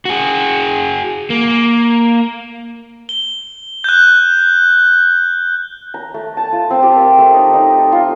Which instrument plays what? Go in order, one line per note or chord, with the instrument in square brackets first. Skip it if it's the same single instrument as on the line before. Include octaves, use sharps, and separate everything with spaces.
[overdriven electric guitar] F#4 G#4
A#3
[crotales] G7
F#6 G6
[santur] A#5
A3
A5
F4
C4
G4
A#4
A3
D#4
D#4
A4
F4